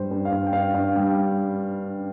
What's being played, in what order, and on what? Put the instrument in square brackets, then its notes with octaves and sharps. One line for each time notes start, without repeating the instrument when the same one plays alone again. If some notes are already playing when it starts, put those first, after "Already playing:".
Already playing: [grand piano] G2 G3 C5
G2
F5
G2
G5
G2 F5
G2 F5
G3 G5